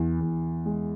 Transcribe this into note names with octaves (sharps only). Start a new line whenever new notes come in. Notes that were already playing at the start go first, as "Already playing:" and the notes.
Already playing: E2
E2
G#3